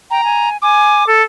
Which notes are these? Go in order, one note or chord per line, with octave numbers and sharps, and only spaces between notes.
G5 A#5
G#5
G#5 D6
A4